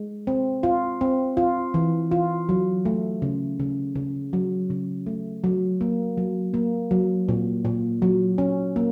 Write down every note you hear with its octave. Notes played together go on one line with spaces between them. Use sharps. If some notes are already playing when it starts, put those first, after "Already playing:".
Already playing: G#3
C4
F4
C4
F4
E3
F4
F#3
A3
C#3
C#3
C#3
F#3
C#3
A3
F#3
A#3
F#3
A#3
F#3
A#2
A#2
F#3
C#4
A#3